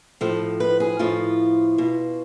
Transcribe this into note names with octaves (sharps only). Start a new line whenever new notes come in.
A2 F3 A4
B4
G#4
A2 F3 F4
B2